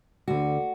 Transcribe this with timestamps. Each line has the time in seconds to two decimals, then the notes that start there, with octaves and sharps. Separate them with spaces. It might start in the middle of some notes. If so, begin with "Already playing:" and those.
0.28 D2 D3 F#4